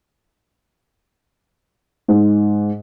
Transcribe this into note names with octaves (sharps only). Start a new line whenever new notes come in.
G#2